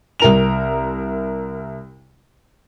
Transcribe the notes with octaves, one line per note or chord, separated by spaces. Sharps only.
C2 A#4 F7